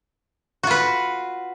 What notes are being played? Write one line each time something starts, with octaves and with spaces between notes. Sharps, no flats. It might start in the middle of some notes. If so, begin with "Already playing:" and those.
F4 F#4 B4